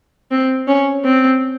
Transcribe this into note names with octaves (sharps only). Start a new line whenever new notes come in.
C4
C#4
C4